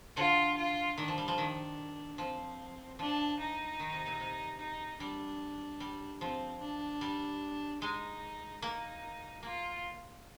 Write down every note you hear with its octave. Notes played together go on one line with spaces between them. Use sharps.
D3 F4
F4
D#3 D4
F3
G3
F3
D#3 D4
F3 C4
F3 D4
D#4
D#3
C3
A#2
C3
D#4
G3 D4
G3
F3 C4
D4
G3
G#3 D#4
A#3 D#4
A#3 F4